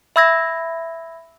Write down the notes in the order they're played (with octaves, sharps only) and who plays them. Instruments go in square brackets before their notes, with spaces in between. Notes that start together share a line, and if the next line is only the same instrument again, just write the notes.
[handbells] E5 B5 E6 G#6 A#6